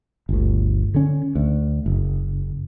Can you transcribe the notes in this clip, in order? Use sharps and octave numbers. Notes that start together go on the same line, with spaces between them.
G1 D2
D3 C#4
D2
F#1